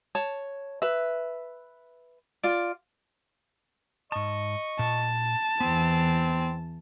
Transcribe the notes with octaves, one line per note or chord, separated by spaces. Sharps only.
C#5 A5
B4 E5
F4 D5
G#2 D#5 A5 C#6
A#2 A5
E2 E3 B3 C4